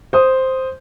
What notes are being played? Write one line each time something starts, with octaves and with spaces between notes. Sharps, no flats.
C5 D#6